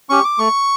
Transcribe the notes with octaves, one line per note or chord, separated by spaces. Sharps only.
C#4 G4 C#6
D6
A3 C#6